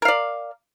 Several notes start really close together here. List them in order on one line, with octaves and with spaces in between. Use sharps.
A#4 F5 D5